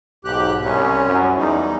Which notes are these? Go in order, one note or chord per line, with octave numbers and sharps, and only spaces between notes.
B1 G#2 G4 F#6
C2 C#4
F#2
E2 G3 D#4